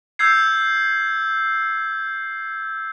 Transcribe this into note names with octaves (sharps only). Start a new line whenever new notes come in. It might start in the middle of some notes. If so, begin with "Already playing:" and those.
E6 G6 G#6 C7